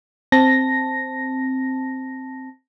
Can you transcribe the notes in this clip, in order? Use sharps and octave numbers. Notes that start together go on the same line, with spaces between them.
C4 A5 A#6